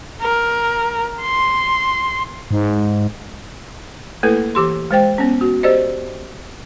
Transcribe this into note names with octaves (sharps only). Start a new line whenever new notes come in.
A#4
C6
G#2
A3 A#3 E4 A4 B4
E3 G4 C6
G#3 C5 G5
B3 C#4
F#4
G4 C5 D5 D#5